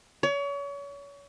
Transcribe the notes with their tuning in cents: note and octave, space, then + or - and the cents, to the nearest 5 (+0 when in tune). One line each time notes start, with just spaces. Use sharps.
C#5 +35